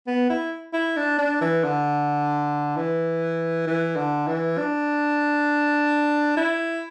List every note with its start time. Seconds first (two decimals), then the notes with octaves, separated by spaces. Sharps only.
0.07 B3
0.30 E4
0.74 E4
0.97 D4
1.19 D4
1.41 E3
1.64 D3
2.77 E3
3.67 E3
3.97 D3
4.28 E3
4.58 D4
6.37 E4